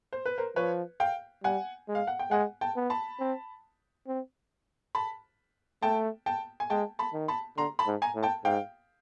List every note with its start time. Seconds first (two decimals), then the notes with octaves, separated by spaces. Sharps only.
0.13 C5
0.25 B4
0.38 A#4 C5
0.56 F3 B4 C#5
1.00 F5 G5
1.44 G3 F#5 G#5
1.88 G#3
1.95 F5
2.07 F#5
2.19 G5
2.31 G#3 F#5 G#5
2.61 G5 A5
2.76 B3
2.90 A5 B5
3.20 C4
4.07 C4
4.95 A5 B5
5.82 A3 G5 A5
6.26 G5 A5
6.60 G#5
6.70 G#3 G5 A5
6.99 A5 B5
7.13 D#3
7.28 A5 B5
7.57 D3 A#5 C6
7.79 A5 B5
7.87 G#2
8.02 G#5 A#5
8.16 A2
8.23 G5 A5
8.45 G#2 F5 G5